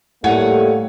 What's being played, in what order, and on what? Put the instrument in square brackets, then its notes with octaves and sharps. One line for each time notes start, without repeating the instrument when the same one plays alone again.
[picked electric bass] A2 [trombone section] G3 A3 A#3 [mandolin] C#5 F#5 G#5